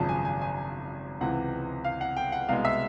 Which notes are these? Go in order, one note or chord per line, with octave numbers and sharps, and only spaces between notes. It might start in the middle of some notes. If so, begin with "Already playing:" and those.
Already playing: G#1 F#2 C#3 F3 A5
G#5
G#5
G#5
C#2 C3 E3 F#5
F5
F#5
G5
F#5
C2 B2 G#3 F5
E5